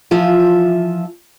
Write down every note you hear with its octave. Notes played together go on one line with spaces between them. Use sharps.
E3 F3 F4 E5